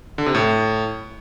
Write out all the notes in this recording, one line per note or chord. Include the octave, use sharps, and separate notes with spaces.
D3
C3
A2